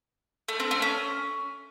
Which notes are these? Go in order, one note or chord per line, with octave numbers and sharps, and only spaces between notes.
A3
C4
A3
C#4